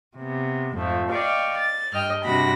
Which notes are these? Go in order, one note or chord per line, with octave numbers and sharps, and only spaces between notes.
C3 B3
F2 G#2 F3 A3
D5 D#5 F5 G5 C#6
A6
G2 D#5 G5 F6
G2 C3 D4 F#4 B5 A#6